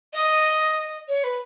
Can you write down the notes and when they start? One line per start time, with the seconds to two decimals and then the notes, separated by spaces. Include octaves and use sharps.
0.13 D#5
1.08 C#5
1.24 B4